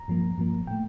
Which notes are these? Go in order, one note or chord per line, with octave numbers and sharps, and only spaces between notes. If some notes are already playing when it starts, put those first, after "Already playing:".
Already playing: A#5
G2 F3 A#3
G2 F3 A#3
A2 A3 G5